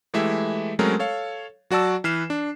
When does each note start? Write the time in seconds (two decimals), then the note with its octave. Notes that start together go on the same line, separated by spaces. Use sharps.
0.14 E3 G#3 A3 E4 G4 E5
0.79 F#3 G#3 A3 C4 C#4 A#4
0.99 A4 C#5 F5
1.70 F#3 F#4 D5 A5 E6
2.04 E3 B4 F6 C7 E7
2.30 D4